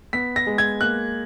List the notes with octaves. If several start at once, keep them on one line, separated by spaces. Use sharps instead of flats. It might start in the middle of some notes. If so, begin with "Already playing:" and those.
B3 B6
A#6
G#3
G#6
A#3 F#6